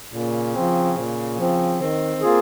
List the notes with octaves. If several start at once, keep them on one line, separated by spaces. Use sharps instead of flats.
A#2 C#3
F3 C4
A#2
F3 C4
D#3 C4
A#3 F4 G#4